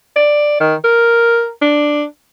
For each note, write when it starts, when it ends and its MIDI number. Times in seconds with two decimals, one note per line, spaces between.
0.16 0.59 74
0.60 0.75 51
0.84 1.50 70
1.62 2.05 62